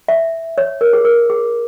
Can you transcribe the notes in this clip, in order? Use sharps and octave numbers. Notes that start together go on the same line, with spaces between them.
E5
C#5
A#4
G#4
A#4
G#4